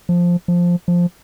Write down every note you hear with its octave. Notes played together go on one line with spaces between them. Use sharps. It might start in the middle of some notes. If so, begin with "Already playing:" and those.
F3
F3
F3